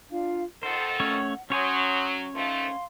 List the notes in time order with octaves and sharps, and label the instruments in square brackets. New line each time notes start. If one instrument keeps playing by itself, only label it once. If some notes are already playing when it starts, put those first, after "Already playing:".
[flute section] D4 F4 F5
[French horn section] F2 D#3 A4 [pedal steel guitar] C5 [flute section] F#5
[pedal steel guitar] A3 C#4 C#5
[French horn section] F#3 [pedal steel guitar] C#4 C#5 G#5 [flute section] C6 D#6 G6
[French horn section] D#3 F3 A3 [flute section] F5 C6